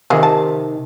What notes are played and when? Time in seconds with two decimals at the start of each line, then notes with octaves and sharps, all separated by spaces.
0.10 C3 D#3 F4 G#4
0.23 A5